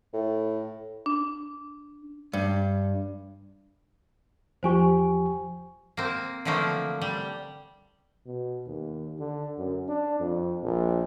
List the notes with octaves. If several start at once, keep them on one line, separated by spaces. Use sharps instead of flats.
A2
D4
G2
E2 F3 G4 C5 G#5 C#6
A#3 C4
D3 E3 F3 A3 A#3
G3
B2
D#2
D3
F#2
D4
F2
A#1